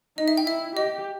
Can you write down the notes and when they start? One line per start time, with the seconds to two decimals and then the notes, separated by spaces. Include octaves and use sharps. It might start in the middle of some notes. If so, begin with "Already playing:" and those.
0.18 D#4 D#5
0.28 E5
0.38 G5
0.47 E4 E5
0.76 G4 D#5